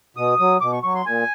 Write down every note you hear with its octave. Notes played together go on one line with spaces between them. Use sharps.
B2 D#6
F#3
B2 D6
C#6
F#3 C#6
C6
A#2 G#5